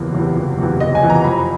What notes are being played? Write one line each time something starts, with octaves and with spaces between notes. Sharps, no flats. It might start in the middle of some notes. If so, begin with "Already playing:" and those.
Already playing: F#1 E2 C3 E3
E2 C3 E3
F#1
E2 C3 E3
F#1 D#5
G#5
E2 C3 E3
A#5
F2 B5